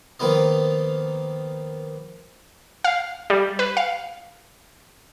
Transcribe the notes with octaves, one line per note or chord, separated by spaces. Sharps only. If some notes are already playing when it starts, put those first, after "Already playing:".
D#3 F3 A#3 B3 F4 D#5
F5
G3
B4
F5